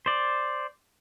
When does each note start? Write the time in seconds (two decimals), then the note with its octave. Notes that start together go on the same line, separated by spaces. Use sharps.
0.06 C5 D5